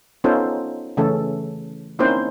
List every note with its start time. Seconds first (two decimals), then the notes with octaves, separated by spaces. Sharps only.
0.24 B3 C#4 D#4 F4 A4 C5
0.97 C#3 E3 A3 C#4 A4
1.99 A#3 C4 C#4 D#4 E4 C5